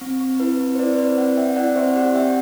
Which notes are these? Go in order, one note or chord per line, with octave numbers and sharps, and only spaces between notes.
C4
C4
E4 B4
C4
C5
E4 B4 D5
C5
C4 B4 D5
C4 D5 F#5
C4 E5 G5
E4 D5 F#5
C4 C5 E5
G4 D5 F#5
C4 E5 G5